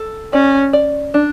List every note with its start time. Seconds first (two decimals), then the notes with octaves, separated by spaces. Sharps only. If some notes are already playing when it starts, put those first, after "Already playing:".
Already playing: A4
0.33 C#4 D5
0.73 D5
1.14 D4